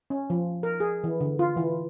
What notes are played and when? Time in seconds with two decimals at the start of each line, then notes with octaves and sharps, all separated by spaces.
0.10 C#4
0.30 F3
0.63 A#4
0.80 G#4
1.04 E3
1.20 D3
1.39 F4
1.57 E3